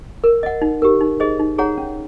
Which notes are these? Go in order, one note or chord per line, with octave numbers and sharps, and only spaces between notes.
A#4
D#5 F#5
D#4
G4 A#4
D#4
G#4 C5 D#5
D#4
G#4 C#5 F#5 A#5
C#4